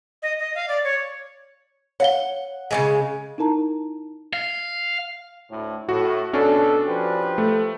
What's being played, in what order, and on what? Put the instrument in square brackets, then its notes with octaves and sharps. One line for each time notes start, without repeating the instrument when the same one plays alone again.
[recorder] D#5
D#5
F5
D5
C#5
[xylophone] C#5 F5 G7 [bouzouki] F#5
[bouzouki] C#3 E3 G#3
[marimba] D#4 E4 A#4 A5 A#5
[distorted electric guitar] F5
[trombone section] D2 A2
[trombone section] A2 [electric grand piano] F#4
[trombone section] B2 A4 [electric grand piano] C#4 D4 F#4
[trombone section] F3 G4 B4
[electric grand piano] A3